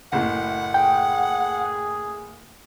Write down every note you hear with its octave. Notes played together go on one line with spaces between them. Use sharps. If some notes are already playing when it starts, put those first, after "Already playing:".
F#1 A2 F#5
G#4 G5